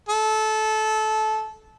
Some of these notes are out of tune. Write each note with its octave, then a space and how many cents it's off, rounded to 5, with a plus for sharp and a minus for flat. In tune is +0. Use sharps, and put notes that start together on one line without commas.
A4 -20